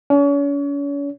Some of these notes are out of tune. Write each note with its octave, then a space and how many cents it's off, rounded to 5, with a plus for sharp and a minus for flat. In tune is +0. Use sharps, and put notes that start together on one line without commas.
C#4 +40 C#5 +35